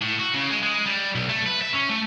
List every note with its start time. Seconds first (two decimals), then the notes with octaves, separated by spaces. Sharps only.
0.02 A2
0.20 F#4
0.34 C#3
0.50 G#3
0.63 G#3
0.86 G3
1.15 B1
1.29 A3
1.46 B4
1.62 E5
1.73 C#4
1.90 A3